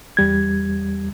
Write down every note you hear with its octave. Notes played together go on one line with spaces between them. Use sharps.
E2 G3 G#6